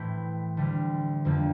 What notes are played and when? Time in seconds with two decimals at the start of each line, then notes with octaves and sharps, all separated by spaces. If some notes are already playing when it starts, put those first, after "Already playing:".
Already playing: A2 E3 A3 C4 E4
0.57 D2 D3 G3
1.25 F2 D3 F3 A#3